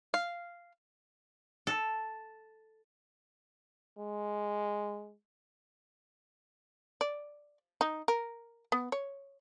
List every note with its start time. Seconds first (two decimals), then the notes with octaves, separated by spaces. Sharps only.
0.14 F5
1.67 A4
3.99 G#3
7.01 D5
7.81 D#4
8.08 A#4
8.72 B3
8.92 C#5